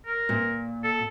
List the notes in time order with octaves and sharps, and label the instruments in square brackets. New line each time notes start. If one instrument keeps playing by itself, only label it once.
[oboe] A#4
[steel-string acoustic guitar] A#2
[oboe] A4